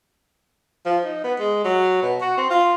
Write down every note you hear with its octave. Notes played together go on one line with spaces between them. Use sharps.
F3
D#4
B3
G#3
F#3
B2
F#4
C4
F4